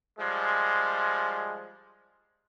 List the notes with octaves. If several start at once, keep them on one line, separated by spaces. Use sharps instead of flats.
F3 G3 G#3